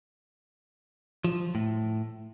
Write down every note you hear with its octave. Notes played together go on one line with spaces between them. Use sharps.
F3
A2